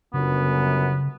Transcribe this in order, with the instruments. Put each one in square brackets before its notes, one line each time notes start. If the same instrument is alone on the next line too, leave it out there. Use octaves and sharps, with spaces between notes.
[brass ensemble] G1 F#2 [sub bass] C#3 [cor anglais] B3